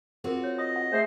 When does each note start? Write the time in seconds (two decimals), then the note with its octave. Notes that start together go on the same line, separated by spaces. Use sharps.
0.24 C4 F4 F#4 G#4 A#4
0.44 C#5
0.59 D#5 D#6
0.76 F#5
0.92 A3 G#4 C5 E5